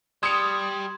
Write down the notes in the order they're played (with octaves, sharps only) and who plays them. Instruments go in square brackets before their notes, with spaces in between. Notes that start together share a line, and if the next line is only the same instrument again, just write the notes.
[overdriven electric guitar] G3 [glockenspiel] C6 G#6 E7 [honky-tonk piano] D#6 C#7